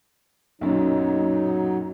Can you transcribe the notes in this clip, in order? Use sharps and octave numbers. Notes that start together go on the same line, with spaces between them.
B1 F#2 A#2 F#3 D#4